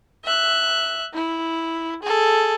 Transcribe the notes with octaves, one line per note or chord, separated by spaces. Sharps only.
E5 F#6
E4
G#4 A4